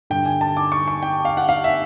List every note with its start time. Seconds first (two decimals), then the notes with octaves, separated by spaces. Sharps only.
0.10 G2 D3 G5
0.25 G#5
0.41 A5
0.57 D6
0.72 C#6
0.88 C#6
1.03 G5
1.25 F5
1.37 F#5
1.49 F5
1.64 E5